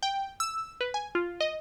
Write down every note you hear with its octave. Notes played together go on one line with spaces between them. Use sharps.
G5
E6
B4
G#5
F4
D#5